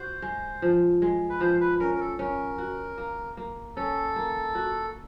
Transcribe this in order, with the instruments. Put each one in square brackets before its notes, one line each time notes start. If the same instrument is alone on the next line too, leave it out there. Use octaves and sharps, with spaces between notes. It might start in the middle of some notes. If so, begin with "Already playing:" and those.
Already playing: [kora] F#4 [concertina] C5
[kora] G#3
F3
G#3
[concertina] B4
[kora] F3 [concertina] C5
[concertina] B4
[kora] C#4 [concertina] A#4
[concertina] A#4
A4
[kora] C#4 [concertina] A#4
[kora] F#4
A#3
A#3
[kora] C#4 [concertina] A4
[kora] A#3
F#4